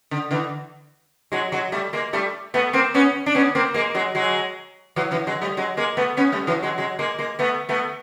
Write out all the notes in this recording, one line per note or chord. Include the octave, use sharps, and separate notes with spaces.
D3
D3 E3
F#3 G#3
F#3 G#3
G3 A3
G#3 A#3
G3 A3
A3 B3
A#3 C4
B3 C#4
D4
B3 C#4
A#3 C4
G#3 A#3
F#3 G#3
F#3 G#3
E3 F#3
E3 F#3
F#3 G#3
G3 A3
F#3 G#3
G#3 A#3
A3 B3
B3 C#4
G3 A3
E3 F#3
F#3 G#3
F#3 G#3
G#3 A#3
G#3 A#3
A3 B3
A3 B3